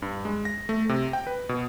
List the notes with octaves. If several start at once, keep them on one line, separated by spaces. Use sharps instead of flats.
G2
G#3
A#6
A3
C3
G5
B4
B2